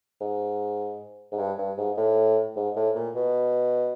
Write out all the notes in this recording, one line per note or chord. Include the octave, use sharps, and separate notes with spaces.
G#2
G#2
G2
G2
G#2
A2
G#2
A2
A#2
B2